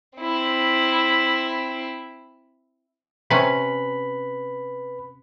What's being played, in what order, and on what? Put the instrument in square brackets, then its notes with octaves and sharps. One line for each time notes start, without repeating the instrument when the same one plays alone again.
[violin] C4 E4
[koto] C3 C#4 [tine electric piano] B4 B5